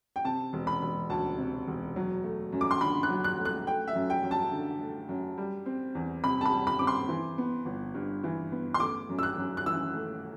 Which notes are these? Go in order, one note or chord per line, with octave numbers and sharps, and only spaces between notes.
G5
C3 A5
E1
B5
E1
D2 A5
C3
E1
F#3
A3
F#2
D6
C6
D3 B5
F#6
F#3
F#6
A3
F#6
A3 G5
E5
F#2
G5
F#2
A5
D3
A3
F#2
G3
C4
E2
C3 B5
A5
B5
G3
B5
C4 D6
C6
E3
B3
G1
G2
E3
B3
C6
A3 D6
F#2
E6
F#6
F#2
F#6
E3 E6
A3